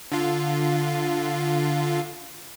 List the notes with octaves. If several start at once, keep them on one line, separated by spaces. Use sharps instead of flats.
D3 F4